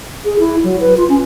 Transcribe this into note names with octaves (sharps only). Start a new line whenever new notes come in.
G#4
E4
F#3
B4
F4
C#4